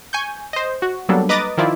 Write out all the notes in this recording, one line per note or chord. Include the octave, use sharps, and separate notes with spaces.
G#5 C#6 G6
C5 D#5
F#4
F#3 G3 A#3 B3 D4 A4
B4 D#5 A#5 D6 D#6 A6
D#3 F3 E4 F4 D5